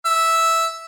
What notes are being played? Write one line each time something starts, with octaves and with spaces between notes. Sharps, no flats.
E5